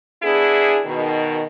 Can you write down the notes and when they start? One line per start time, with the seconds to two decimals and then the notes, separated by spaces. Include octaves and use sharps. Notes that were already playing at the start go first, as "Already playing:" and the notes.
0.23 B3 D4 E4 G#4
0.85 B2 D#3